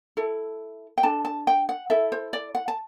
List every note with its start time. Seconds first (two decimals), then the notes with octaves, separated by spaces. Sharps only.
0.17 E4 A4
0.98 G5
1.03 D4 A4 A5
1.25 A5
1.47 G5
1.69 F#5
1.90 E4 A4 E5
2.12 C5
2.33 D5
2.55 F#5
2.68 A5